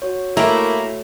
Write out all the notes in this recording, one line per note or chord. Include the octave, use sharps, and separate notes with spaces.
F#4 C#5
A3 A#3 E4 D#5 G5 A#5